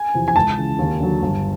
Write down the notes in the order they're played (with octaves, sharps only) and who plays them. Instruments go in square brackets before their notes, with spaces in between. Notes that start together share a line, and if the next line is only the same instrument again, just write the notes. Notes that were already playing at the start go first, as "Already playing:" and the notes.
Already playing: [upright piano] G#5
[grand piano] E2 C3 F3
[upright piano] G#5
[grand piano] C#2 [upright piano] A5
[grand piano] C#3 E3
D#2
D3 F#3
G1